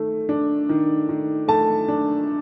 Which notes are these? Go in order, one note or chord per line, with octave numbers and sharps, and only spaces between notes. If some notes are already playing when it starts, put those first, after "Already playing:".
Already playing: D#3 A3
D4
D#3
D#3
A3 A5
D4